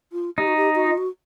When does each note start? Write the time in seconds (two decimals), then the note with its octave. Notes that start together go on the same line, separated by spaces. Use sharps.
0.13 F4
0.38 D#4 G4
0.47 F#4
0.57 G4
0.75 F#4
0.87 F4
0.98 F#4